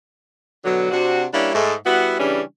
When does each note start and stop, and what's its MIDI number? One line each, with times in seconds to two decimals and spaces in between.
0.64 0.89 47
0.64 0.89 50
0.64 0.89 54
0.91 1.25 48
0.91 1.25 60
0.91 1.25 62
0.91 1.25 66
1.33 1.51 55
1.33 1.51 58
1.33 1.51 61
1.33 1.51 62
1.33 1.51 64
1.54 1.74 44
1.54 1.74 57
1.85 2.19 55
1.85 2.19 59
1.85 2.19 64
1.85 2.19 66
2.19 2.41 49
2.19 2.41 52
2.19 2.41 55
2.19 2.41 61
2.19 2.41 62